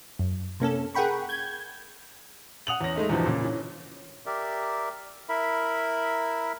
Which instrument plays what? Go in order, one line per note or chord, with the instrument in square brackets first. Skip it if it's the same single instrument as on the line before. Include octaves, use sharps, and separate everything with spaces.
[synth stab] F#2
C3 A#3 C#4 A4
G#4 A#4 F#5 G5 B5 C#6
G6 G#6
[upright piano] F#5 D#6 F7 F#7
E2 C#4 A#6
G#3 A3 D#4
E2 G2 B2 E3 F3
A#2 C#3
E3 C#4
[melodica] G4 A#4 D5 E5
E4 A#4 E5 B5